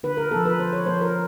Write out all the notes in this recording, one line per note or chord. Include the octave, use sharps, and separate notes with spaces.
D3 B4
A#4
F3 A#3 A4
B4
D3 C5
C#5
F3 A#3 C5
A#4